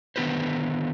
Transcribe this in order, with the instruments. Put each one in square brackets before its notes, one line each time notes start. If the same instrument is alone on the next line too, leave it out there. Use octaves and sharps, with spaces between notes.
[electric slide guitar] D3 D#3 B3 F4 B4 C5